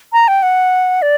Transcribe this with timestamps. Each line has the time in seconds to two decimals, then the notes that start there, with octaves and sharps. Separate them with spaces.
0.13 A#5
0.28 G5
0.43 F#5
1.02 D5